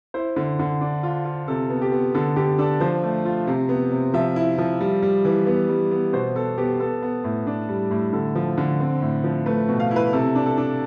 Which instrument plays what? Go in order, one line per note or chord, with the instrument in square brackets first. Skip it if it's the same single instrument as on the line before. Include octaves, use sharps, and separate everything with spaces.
[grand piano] E4 C5
D3
D3
D4
F4
F4
C3 A4
B3
G4
B3
D3 A4
D3 G4
D4 A4
F3 C5
A3
F4
C3
B3
C3
F3 E5
E4
F3
G3
G3
E3
B3
G3
B3
B2 C5
B3 A4
B3 G4
B3 A4
B3
A2
D4
G3
A2
D3 A4
F3
D3
C4
A2
F3
A3 B4
B2
F5
E4
B4
C3 A4
D4
A4
D4